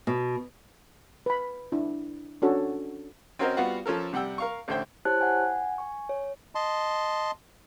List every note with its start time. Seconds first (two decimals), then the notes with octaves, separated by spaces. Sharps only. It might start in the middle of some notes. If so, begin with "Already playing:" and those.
0.07 B2
1.26 B4 B5
1.72 D4 E4
2.42 C#4 D4 F#4 A4 C#5
3.39 C4 C#4 F#4 A#4 C5 D#5
3.57 G3 B3 F4 F#4 F5 F#5
3.86 F3 C#4 A4 A#4
4.13 C3 G3 F#5 G5 E6
4.38 A#4 F5 C#6
4.68 A1 D3 C5 E5 G5
5.05 E4 G4 C5 C#5 A5 F#6
5.21 F#5 G#5
5.78 G#5 C#6
6.09 C#5
6.55 D#5 A5 C6